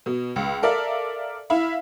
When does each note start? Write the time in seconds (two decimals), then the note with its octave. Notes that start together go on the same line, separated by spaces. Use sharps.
0.06 B2
0.36 C#2
0.62 A4 A#4 D5 E5 F5
1.50 E4 E5 F5